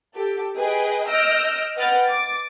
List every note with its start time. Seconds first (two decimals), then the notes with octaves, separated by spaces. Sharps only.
0.14 G4 A4
0.57 G#4 B4 D#5 G5
1.08 D#5 E6 F6 G6 A#6 D7
1.76 B4 D#5 F#5 G5 F6 A6
2.05 D6 A6